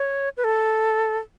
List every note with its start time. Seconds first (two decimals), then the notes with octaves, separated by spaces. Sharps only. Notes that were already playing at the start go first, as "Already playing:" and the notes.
Already playing: C#5
0.37 B4
0.44 A4